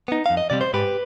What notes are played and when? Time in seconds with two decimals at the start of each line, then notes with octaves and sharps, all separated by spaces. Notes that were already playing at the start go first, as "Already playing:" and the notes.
0.08 B3 D#4
0.26 F2 F5
0.37 D#5
0.50 C3 G3 C4 D5
0.61 C5
0.73 G#2 G4 B4